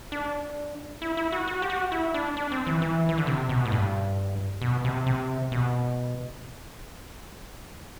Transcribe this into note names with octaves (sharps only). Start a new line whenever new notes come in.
D4
E4
E4
F#4
F#4
G4
F#4
E4
D4
D4
C4
E3
E3
E3
D3
C3
B2
A2
G2
B2
C3
C3
B2